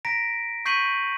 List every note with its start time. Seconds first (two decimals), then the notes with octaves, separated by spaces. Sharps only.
0.05 A#5 A#6 B6 D7
0.65 C#6 G6 B6 C7 D#7 F#7